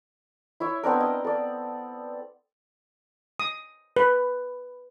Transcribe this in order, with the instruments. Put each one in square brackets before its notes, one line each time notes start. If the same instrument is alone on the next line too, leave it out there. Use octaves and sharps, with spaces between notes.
[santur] E4 C#5 E5
B3 C4 D4 A#4
D#5
A4 D5
[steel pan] D#6
B4